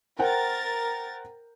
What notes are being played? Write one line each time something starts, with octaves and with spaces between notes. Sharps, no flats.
A#4 C5 F#5 G5 A6